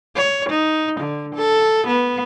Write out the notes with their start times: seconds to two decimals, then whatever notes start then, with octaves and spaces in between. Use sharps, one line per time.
0.16 C#5
0.50 D#4
1.00 D3
1.35 A4
1.87 B3